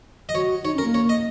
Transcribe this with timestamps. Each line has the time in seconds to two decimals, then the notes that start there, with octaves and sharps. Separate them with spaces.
0.29 D#5
0.34 F#4 C#5
0.64 D#4 C#5
0.74 C#4
0.78 A#4
0.84 A#3
0.94 C#5
1.09 D#5